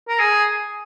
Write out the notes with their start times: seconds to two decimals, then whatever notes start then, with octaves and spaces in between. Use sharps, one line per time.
0.09 A#4
0.19 G#4